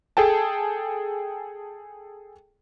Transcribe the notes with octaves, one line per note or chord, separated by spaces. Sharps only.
G#4 A4 G5 A5